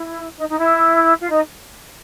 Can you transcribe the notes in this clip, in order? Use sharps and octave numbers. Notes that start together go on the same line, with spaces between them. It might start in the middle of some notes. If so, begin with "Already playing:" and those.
Already playing: E4
D#4
D#4
E4
F4
D#4